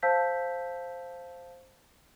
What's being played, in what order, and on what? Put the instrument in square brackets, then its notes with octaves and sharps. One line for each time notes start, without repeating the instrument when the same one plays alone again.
[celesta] C5 F5 A5 E6 G6 B6